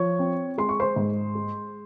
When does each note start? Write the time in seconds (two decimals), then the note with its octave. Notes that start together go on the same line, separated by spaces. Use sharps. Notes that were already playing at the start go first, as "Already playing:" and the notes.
Already playing: F3 C#5 C#6
0.19 C4
0.58 G#3 C6
0.69 C#6
0.80 C5 C6
0.96 G#2
1.35 G#3